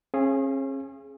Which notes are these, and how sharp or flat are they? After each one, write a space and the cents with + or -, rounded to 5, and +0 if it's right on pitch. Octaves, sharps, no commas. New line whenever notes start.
C#4 -40 G#4 +5 F5 -30